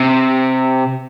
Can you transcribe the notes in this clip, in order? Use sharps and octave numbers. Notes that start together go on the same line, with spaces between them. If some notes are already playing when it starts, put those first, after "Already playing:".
Already playing: C3